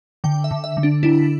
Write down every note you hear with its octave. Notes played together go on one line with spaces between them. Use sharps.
D3 G5
E5
D3
E5
D3
D4
D4 E4